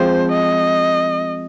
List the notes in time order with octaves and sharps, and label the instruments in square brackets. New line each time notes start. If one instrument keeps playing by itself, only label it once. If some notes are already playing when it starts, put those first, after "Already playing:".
Already playing: [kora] F3 G#3 C4 [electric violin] C5
[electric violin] D#5